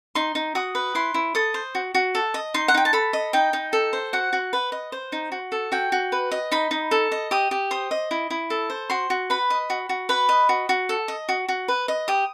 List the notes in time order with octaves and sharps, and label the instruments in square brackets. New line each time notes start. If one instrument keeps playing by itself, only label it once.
[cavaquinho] D#4 C6
D#4
F#4 D#6
B4
E4 C6
E4
A4 D#6
C5
F#4
F#4
A4
D#5
D#4 C6
F#5
D#4 G5
A5
A4 B5
D#5
D#4 G5
D#4
A4
C5
F#4 F#5
F#4
B4
D#5
C5
D#4
F#4
A4
F#4 G5
F#4
B4
D#5
D#4 B5
D#4
A4
D#5
G4 D#6
G4
C5 D#6
D#5
E4
E4
A4
C5
F#4 C6
F#4
B4 B5
D#5
F#4
F#4
B4 B5
D#5
F#4
F#4
A4
D#5
F#4
F#4
B4
D#5
G4 D#6